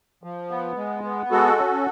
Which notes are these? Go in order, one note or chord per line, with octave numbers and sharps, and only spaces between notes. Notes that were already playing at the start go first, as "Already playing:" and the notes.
F3
B3
G#3
B3
G#3 F#4 A4
C#4